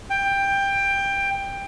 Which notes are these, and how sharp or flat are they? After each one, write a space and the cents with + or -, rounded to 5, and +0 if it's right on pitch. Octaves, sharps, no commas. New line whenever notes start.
G5 +15